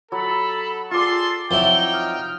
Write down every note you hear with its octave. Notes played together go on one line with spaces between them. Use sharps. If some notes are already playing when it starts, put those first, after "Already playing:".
F#3 A4 B5
F4 G#4 A4 D5 C6 A6
F2 F#3 D#4 E4 G5 G7
D#5 F6